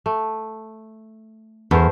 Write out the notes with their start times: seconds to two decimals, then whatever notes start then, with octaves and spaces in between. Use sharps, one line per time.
0.06 A3
1.71 E2 A3 A#4 C5